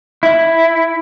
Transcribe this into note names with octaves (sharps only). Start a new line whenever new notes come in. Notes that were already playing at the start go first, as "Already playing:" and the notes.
E4